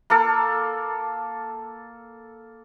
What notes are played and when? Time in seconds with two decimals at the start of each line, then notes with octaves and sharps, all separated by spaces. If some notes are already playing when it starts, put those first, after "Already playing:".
0.10 A#3 A4